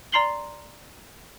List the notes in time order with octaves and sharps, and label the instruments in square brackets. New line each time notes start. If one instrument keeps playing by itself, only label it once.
[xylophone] D5 A#5 C6 C7 F#7 G7